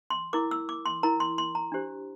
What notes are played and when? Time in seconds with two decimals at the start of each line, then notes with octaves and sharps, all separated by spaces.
0.10 C6
0.33 E4 A#4 D6
0.51 E6
0.69 D6
0.86 C6
1.03 E4 A#4 A#5
1.20 C6
1.38 C6
1.55 A#5
1.72 D4 G4 C5